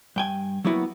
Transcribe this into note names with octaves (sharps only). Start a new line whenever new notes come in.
G2 G5 G#5
F#3 A#3 B3 E4 F#4